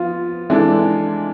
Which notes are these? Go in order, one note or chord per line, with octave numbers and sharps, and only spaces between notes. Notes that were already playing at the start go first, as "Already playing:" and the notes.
Already playing: F3 B3 F4
E3 G#3 D4 A4